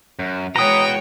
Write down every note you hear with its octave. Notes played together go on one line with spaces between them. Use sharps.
F#2
E3 G#3 F#4 B4 C#5 G5 A#5 D#6